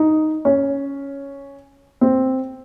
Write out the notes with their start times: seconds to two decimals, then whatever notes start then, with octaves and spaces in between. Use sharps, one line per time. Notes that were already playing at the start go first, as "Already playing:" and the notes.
Already playing: D#4
0.45 C#4
2.01 C4